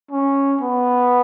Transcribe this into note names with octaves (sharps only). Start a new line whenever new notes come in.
C#4
B3